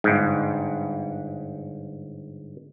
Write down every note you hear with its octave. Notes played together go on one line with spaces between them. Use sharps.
G1 G#2